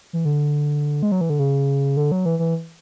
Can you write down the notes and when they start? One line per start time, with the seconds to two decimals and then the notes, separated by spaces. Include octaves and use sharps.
0.13 E3
0.25 D3
1.03 G#3
1.12 F#3
1.21 E3
1.30 D3
1.39 C#3
1.97 D3
2.12 F#3
2.26 E3
2.39 E3